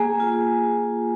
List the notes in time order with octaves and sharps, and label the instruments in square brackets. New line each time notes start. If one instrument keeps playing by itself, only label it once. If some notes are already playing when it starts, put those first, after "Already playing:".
Already playing: [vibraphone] A#3 G#4 G#5
F4